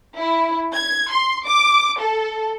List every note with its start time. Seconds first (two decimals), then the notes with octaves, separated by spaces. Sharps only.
0.17 E4
0.75 G#6
1.11 C6
1.46 D6
2.00 A4